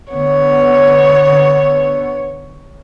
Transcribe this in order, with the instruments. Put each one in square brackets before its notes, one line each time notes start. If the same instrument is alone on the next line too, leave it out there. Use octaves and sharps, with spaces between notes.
[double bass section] D3 B3 [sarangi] C#5